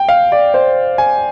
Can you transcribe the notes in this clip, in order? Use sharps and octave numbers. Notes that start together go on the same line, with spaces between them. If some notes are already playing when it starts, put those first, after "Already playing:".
Already playing: G5
F5
D5
C5
G#5